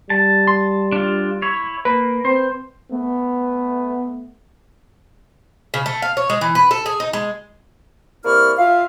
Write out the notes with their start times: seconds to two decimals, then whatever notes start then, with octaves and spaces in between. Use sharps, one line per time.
0.10 G3 A5
0.48 C6
0.92 D4 F4
1.42 E4 C#5
1.85 A#3 B4
2.25 C4 C5
2.91 A3 B3
5.74 C#3
5.86 A3
6.02 F5
6.17 C#5
6.30 G#3
6.41 E3
6.55 B4
6.71 A4
6.86 G#4
7.00 D#4
7.13 G#3
8.25 C3 A#3 E4 D5 C#6 F6
8.58 F4 E5 F5